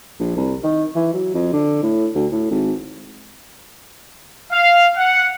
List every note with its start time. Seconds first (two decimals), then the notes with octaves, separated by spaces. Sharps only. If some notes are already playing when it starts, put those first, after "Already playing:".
0.20 A#1
0.36 C2
0.64 D#3
0.96 E3
1.14 F#3
1.34 F2
1.53 D3
1.83 A2
2.15 D2
2.32 A2
2.51 G#1
4.52 F5
4.97 F#5